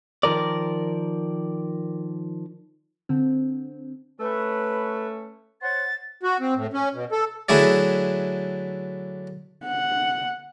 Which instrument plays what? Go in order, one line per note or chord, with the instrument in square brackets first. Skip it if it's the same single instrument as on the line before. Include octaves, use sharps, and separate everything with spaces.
[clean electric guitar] D#3 F3 A#4 D5
[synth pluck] D3 C4
[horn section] A3 C#4 [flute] B4
[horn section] C5 C#5 F#5 [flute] A6
[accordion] F#4
C4
A2
C#4
B2
A4
[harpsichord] D3 F#3 A3 E4 G#4 D5
[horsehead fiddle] F#5